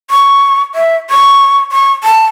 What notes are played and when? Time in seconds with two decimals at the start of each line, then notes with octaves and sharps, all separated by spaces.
0.11 C#6
0.75 E5
1.10 C#6
1.72 C#6
2.04 A5